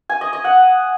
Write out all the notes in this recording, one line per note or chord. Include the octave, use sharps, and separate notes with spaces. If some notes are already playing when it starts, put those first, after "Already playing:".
G#5
D#5
D#5
F#5